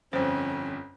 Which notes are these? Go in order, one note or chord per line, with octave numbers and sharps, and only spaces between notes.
G1 F2 C#4 C5